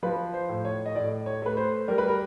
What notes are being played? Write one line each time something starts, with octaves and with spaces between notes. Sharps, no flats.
F3 B4
C5
A2
C#5
D#5
A2 D5
C#5
A3 B4
C5
G3 A#4
B4
A#4